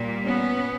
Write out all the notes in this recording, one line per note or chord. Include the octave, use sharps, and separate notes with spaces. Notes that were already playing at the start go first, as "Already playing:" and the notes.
Already playing: A#2 G3
B3 C#4